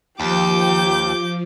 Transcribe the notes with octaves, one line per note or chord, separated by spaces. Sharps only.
D#2 F3 G4 D6 G6